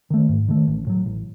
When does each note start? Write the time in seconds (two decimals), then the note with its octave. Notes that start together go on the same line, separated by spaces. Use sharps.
0.10 D#3 A3
0.29 G#2
0.48 D#3 A3
0.68 A1
0.87 A2 F#3
1.06 A1